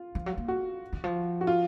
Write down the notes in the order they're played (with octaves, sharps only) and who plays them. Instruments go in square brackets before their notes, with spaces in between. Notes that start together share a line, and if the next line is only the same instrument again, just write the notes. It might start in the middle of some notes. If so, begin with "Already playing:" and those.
Already playing: [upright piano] F4
[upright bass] F3
F#3
A#3
[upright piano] F#4
[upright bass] D#3
F3
[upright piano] F#4
F4